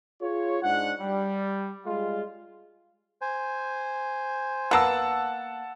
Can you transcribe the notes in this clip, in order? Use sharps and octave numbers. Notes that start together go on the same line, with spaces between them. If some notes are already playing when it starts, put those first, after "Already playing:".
F4 G#4 C#5
G#2 D4 F#5
G3
G3 G#3 F4
C5 G#5
A#3 B3 F#5 A5 E6